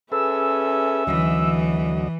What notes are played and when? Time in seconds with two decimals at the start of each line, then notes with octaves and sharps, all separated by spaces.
0.12 C#4 G#4 A4 B4 E5 E6
1.07 D2 E3 F#3 D#5